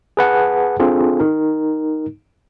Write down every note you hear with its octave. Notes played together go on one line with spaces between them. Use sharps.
G#4 B4 F#5 A5
C4 D4 F4 G#4 A4
D#4 A#4